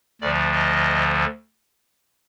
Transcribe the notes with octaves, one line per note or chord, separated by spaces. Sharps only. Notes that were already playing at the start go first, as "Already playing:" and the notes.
D2 D3 F3 D5
D#5